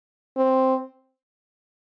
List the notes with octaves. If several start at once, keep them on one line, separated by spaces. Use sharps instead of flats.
C4